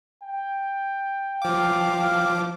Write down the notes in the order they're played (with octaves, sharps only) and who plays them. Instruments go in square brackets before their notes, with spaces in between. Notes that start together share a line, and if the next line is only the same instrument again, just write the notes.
[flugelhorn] G5
[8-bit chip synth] F3 D6 [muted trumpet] F5